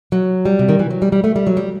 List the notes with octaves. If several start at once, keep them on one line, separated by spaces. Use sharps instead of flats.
F#3
G3
C3
D#3
E3
F#3
G3
G3
A3
G3
F#3
G3